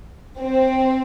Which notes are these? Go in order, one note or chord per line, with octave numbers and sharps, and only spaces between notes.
C4